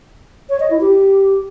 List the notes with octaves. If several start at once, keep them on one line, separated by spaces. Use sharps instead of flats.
C#5
D#5
E4
G4